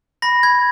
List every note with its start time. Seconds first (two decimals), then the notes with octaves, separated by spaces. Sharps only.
0.22 B5 A#6
0.43 B5 G#6